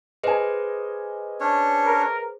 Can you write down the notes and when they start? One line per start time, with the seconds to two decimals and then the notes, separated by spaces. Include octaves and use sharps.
0.23 G#4 B4 C5 D#5 G#5
1.40 C#4 D4 C#5
1.86 A#4